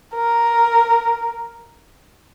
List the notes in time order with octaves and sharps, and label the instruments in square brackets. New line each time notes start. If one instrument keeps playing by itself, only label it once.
[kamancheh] A#4